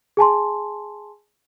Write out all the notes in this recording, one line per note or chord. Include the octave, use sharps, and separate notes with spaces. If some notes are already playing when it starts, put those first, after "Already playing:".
G#4 G#5 A5 C6